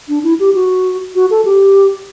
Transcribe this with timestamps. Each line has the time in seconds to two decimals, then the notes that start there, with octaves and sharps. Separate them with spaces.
0.09 D4
0.24 E4
0.40 G4
0.55 F#4
1.15 F#4
1.31 A4
1.45 G4